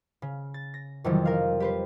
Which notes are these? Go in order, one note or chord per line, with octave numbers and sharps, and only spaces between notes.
C#3
A6
A#6
F2 C3 D#3 E3 F#3 G3
A#4 F5
G4 B4 C5